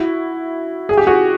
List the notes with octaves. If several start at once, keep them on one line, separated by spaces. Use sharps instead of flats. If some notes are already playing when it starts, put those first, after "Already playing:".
Already playing: E4 F#4
G#4
G4
F#4 G#4